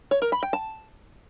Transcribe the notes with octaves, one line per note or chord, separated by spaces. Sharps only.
C#5
A#4
B5
G5
A5